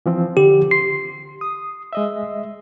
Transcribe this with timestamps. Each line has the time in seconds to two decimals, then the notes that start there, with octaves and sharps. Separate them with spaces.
0.06 E3 F3 C4
0.37 D3 G4
0.71 C6 C7
1.41 D#6
1.93 G#3 D#5 E5